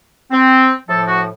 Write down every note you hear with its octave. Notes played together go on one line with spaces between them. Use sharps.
C4
A2 F3 A4
F#4